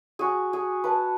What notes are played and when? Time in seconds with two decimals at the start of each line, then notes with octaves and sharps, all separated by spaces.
0.19 F#4 G#4
0.53 G#4
0.84 B4 A5